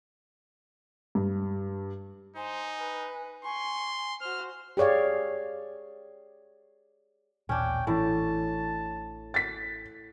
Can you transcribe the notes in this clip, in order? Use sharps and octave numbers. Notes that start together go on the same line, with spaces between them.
G2
D#4 C5 G#5
B4
G#5 C6 C#6
F#4 C5 F6
G4 G#4 C#5 D5 F5
A1 D#2 A#2 C#4 D4 G5
A1 A2 E3 C#4 A5
A6 B6